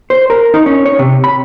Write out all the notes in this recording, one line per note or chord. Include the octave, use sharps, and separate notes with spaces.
C5
A#4
D#4
C#4
C#5
C3
B5